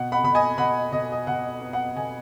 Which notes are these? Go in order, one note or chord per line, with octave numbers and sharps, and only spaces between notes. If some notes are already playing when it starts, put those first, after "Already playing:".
Already playing: B2 F#5
F#5 B5
B2 B5
D#5 G#5
B2 F#5 B5
B2 D#5
D#5
B2 F#5
B3
F#5
B2 D#5 G#5